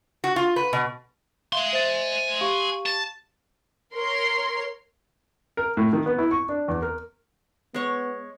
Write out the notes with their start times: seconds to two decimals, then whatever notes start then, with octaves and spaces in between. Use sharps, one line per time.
0.24 F#4
0.36 F4
0.56 B4
0.73 B2
1.53 E5 F5 G#5 C6
1.73 C5 E5 A6
2.41 G4 F5 C#6
2.86 A5
3.94 A#4 C#5 C6
5.57 A#4
5.77 A2
5.93 D#3
6.06 B3
6.18 E4
6.31 C#6
6.49 D4
6.68 E2
6.82 A#4
7.74 G#3 B3 C#5